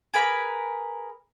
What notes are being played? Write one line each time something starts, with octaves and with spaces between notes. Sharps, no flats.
G#4 A#4 B4 B5